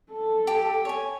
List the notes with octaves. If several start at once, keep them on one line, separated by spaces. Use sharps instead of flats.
A4
G4
C#5 G#5